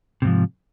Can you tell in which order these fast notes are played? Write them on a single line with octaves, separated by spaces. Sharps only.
C3 G#2 F3